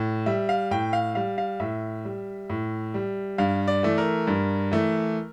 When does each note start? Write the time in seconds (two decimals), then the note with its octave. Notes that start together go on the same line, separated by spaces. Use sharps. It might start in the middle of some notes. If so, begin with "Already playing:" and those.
Already playing: A2
0.26 G3 E5
0.49 F5
0.71 A2 G5
0.93 F5
1.15 G3 F5
1.38 F5
1.60 A2 E5
2.05 G3
2.50 A2
2.94 G3
3.38 G2 F5
3.68 D5
3.83 E3 A3
3.98 A#4
4.27 G2
4.72 E3 A3